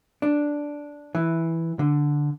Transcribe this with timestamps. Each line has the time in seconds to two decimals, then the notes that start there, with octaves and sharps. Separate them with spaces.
0.22 D4
1.15 E3
1.79 D3